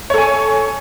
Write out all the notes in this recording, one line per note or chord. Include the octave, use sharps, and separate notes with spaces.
A4 C#5 G#5